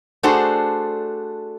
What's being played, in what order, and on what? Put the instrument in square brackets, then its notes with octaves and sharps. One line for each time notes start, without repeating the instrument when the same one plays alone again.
[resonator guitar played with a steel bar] A3 D4 F#4 G#4 A4 C5